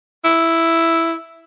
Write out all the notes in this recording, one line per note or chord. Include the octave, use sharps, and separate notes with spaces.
E4